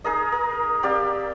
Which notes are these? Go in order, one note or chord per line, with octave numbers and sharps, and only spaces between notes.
D#4 G#4 A#4 D#5
A#4
C4 G4 D5 F5